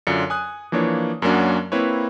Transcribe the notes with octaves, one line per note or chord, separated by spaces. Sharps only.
F#2 D3 D4 F4 C#7
G#5 D#6 F#6
E3 F3 A#3 D4 C#5
F#2 F#3 A#3 C#4 D4 F#4
A#3 C4 E4 B4 C#5